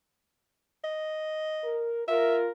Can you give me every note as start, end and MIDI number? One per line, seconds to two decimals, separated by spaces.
0.84 1.92 75
1.64 2.02 70
2.07 2.48 65
2.07 2.48 70
2.07 2.36 76